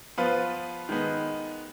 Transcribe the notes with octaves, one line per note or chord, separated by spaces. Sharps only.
F3 B3 F4 B4
D#3 G#3 B3